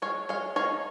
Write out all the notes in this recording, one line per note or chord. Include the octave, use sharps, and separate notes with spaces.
G#3 C#5 F5
G#3 C#5 F5
D#4 C#5 F5